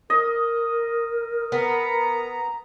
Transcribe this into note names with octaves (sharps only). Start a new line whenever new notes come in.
A#4 D#5
B3 A#5